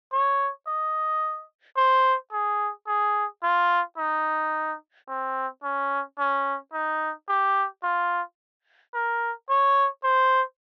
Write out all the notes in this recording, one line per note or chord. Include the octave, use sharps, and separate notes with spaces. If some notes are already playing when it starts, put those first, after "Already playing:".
C#5
D#5
C5
G#4
G#4
F4
D#4
C4
C#4
C#4
D#4
G4
F4
A#4
C#5
C5